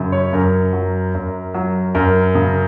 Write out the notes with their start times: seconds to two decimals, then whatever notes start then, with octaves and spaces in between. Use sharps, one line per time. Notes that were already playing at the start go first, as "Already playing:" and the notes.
Already playing: F#2 C#3
0.12 C#5
0.33 F#2 A#4
0.73 F#3
1.14 F#2
1.54 F#3
1.95 F#2 A#4
2.35 C#3